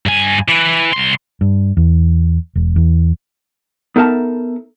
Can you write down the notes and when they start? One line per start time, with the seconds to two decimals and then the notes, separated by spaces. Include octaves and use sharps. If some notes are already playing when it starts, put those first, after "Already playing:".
0.06 G2 G#5
0.48 E3
0.93 C2 C6
1.41 G2
1.77 E2
2.55 E1
2.76 E2
3.96 B3 D#4 A4 A#4 E5 A5